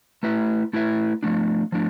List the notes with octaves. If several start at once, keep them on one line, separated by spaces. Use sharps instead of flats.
A3 E4 B4 E5
A3 E4 B4 E5
F3 A3 D4
F3 A3 D4